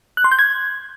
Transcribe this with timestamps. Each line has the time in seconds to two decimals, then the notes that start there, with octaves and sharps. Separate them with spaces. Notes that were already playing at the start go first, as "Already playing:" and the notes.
0.17 F#6
0.24 C6
0.31 G6
0.39 G#6